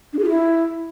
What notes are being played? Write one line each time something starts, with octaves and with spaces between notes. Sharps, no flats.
D4
G#4
F4
E4